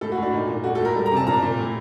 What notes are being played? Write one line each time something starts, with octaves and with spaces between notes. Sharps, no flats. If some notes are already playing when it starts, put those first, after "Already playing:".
A2 A4
F#4
A2
D4
A#2 D#4
A#2
A3 F#4
A4
A2 A#4
G3
A#5
C3 A5
A#2 A#5
A#2
A2